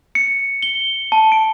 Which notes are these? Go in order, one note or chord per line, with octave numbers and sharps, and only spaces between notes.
C#7
G7
A5
D7